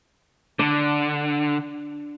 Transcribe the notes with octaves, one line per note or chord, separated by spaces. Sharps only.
D3 D4